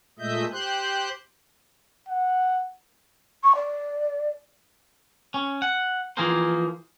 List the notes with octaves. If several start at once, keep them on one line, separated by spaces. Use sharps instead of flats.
A#2 G#3 A3 D#5 E5 G6
G4 C5 C6 F#6 G6
F#5
C#6
D5
C#4
F#5
E3 F3 A#3 G#4 A#4 C5